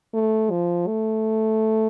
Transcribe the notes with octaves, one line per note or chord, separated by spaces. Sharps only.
A3
F3
A3